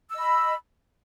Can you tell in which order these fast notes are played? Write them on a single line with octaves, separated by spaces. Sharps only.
E6 D#5 B5